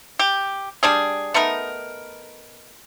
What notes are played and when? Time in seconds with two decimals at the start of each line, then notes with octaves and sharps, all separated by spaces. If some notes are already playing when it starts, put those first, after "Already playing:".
0.19 G4
0.83 G3 D4 G#4
1.34 A3 B3 D#4 A#4